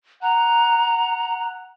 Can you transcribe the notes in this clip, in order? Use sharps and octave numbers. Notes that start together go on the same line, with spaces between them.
F#5 A#5